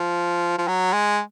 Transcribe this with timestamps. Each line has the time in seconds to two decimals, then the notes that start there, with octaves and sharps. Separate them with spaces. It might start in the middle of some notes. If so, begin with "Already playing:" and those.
Already playing: F3
0.58 F3
0.68 F#3
0.93 G#3